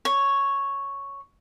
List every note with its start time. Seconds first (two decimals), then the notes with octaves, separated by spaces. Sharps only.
0.05 C#5